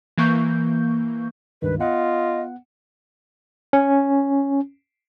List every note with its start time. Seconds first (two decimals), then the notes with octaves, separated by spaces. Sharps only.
0.18 E3 A#3 C#6 G6
1.62 C#2 G2 D#3 B4
1.80 B3 F4 D#5 F#5
3.73 C#4